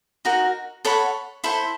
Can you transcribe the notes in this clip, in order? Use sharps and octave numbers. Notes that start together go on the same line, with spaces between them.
D#4 F#4 A#4
A4 C#5 F#5 B5
E4 A4 C5